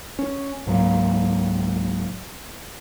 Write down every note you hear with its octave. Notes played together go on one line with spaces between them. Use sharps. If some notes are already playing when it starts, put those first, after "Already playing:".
C#4
C#2 G#2 F#3 A#3